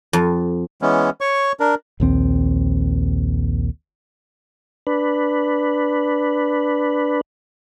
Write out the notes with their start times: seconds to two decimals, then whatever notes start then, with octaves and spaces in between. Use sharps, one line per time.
0.13 F2
0.82 E3 G#3 B3 C#4
1.21 C#5 C#6
1.60 D4 A#4
2.00 A#1 D#2 C4
4.87 D4 B4